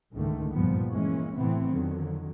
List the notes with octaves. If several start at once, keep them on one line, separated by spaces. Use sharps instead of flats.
C#2 G#2 D3 D#3 A3
F#1 G2 A#2 F3 G3 B3
E3 G#3 A#3 C#4
A2 C3 E3 A3 B3 C4
F2 D3 D#3 F#3